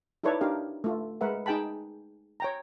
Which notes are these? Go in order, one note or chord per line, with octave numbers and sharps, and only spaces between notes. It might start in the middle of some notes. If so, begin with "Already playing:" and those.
D#4 E4 A4 B4 C#5 D5
D4 D#4 G4 A#4 F5
A3 F4
G#3 A#4 B4 E5 F#5
D#4 G#4 G5 A5 B5
C#5 G5 A#5